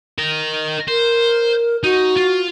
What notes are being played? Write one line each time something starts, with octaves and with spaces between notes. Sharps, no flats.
A#4 D#5
A#4 C5
D#4 F#4
F4